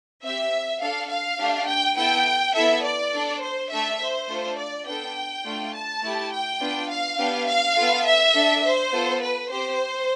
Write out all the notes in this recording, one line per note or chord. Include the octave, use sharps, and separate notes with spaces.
C4 G4 E5
D4 A4 F5
F5
A3 D4 G4
G5
B3 E4 A4 G5
B3 E4 A4 E5
D5
D4 A4
C5
A3 D4 A4 E5
C5
A3 D4 F4 A4
D5
B3 D4 A4 G5
A3 D4 F4
A5
A3 E4 G4
G5
B3 D4 F4
F5
B3 D4 G4
F5
B3 F4 A4
E5
D4 A4
C5
B3 F4 A4
B4
C4 G4 C5